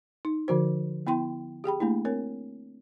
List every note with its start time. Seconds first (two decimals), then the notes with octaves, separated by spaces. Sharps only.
0.25 D#4
0.48 D3 F3 F#4 C5
1.07 B3 E4 G5 C6
1.64 G4 G#4 G5 B5
1.80 A3 A#3 D4 E4
2.05 C4 A#4 C#5